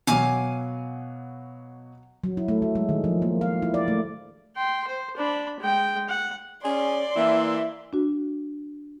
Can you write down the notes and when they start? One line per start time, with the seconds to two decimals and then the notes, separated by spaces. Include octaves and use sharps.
0.07 B2 F#3 F5 G#5 D6
2.24 F#3
2.37 E4
2.48 A3
2.62 F#3
2.75 G#3
2.89 D#3
3.04 F3
3.22 A#3
3.41 F5
3.62 E4
3.74 D5
3.88 A3
4.56 G5 C6
4.87 C5
5.17 D4 B5
5.60 G#3 G5
6.09 F#5
6.64 C#4 G#4 D5 C6
7.16 E3 A#3 E5
7.93 D4 F#4